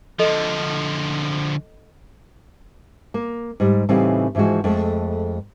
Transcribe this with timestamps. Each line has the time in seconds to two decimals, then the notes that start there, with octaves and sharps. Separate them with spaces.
0.19 D3 F3 A4 D#5
3.14 A#3
3.60 G#2 G3
3.89 A2 C#3 E3 G3 C4 D#4
4.35 G#2 E3 F3 G#3 F#4
4.64 F2 G#3 A3